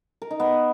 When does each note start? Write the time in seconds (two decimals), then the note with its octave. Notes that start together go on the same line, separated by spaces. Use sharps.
0.22 A#4
0.31 D#4
0.40 B3